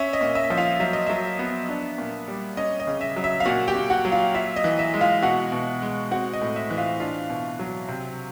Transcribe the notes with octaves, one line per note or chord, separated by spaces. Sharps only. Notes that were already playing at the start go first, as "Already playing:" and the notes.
Already playing: C#4 E5
D#5
A#2
E5
F3
F4 F5
F#3 E5
D#5
F#3 E5
B3
D4
A#2
G3
C#4 D#5
D#5
C#3
E5
F#3
E5
F5
A#2 F#4 F#5
G4 G5
A#2
F#4 F#5
F#3
F4 F5
F4 E5
D#5
E3
E5
G#3
F4 F5
B2 F#4 F#5
B2
G#3
C4 F#4 F#5
D#5
A2
E5
E3
F4 F5
D4 F4 F5
B2
F#3
C3